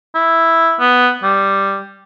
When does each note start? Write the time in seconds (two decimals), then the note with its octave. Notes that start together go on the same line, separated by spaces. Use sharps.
0.15 E4
0.80 B3
1.23 G3